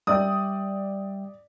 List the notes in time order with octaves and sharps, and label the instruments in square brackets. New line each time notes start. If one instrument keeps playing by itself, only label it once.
[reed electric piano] G3 E5 G5 [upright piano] D5 D#6